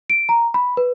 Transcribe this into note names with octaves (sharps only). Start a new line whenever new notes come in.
D7
A#5
B5
B4